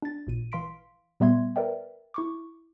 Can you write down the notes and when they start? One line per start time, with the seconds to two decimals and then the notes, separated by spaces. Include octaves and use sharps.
0.02 D4 A6
0.27 A1 A#2 D#7
0.52 E3 F5 C6 B6 D7
1.20 A#2 G3 B3 E5 C6 G#6
1.56 A#4 B4 D5 E5 G5
2.14 E4 C#6 D6